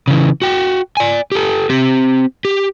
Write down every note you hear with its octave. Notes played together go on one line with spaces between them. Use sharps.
C#3 E3
F#4 G5
D5 G#5
G4 A4
C4 G4
G4